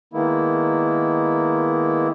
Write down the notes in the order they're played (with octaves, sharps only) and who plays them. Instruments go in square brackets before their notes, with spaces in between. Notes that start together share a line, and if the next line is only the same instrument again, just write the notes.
[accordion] D#3 G#3 A#3 B3 E4